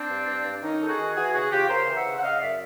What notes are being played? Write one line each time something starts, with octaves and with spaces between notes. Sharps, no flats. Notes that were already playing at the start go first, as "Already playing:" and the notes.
Already playing: C4 D4
G2
G2
G2
D#3 C#4 D#4
D#3 A4
F#4 G#4
D#3
E3 F#4 G#4
C#3 F#4 G#4
C#3 F4 G4
C#3 A#4 C5
E3
E5 F#5
C#3
F#5
C#3 D#5 F5
F#2 D5 E5